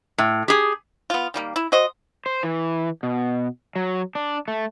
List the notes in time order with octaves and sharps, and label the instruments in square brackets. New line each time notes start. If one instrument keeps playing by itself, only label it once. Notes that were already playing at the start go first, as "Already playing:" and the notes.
[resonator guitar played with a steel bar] A2
G4 G#4
[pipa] B3 F4
D#3 G3 A#3
E4
F#4 C5 D#5
[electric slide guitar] C5
E3
B2
F#3
D4
A3